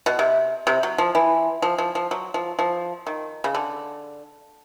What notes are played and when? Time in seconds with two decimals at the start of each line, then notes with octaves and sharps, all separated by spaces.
0.06 B2
0.19 C3
0.67 C3
0.83 F#3
0.98 F3
1.15 E3
1.62 F3
1.78 F3
1.95 F3
2.11 F#3
2.34 F3
2.59 F3
3.07 D#3
3.44 C#3
3.55 D3